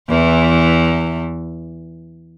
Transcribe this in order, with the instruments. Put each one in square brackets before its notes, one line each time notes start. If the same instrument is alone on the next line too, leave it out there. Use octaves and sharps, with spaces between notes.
[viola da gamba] E2 E3